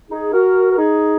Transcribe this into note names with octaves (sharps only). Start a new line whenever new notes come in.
D#4 G#4
F#4 A#4
A#4
D#4 G#4